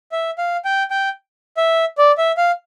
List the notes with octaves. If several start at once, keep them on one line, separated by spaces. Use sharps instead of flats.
E5
F5
G5
G5
E5
D5
E5
F5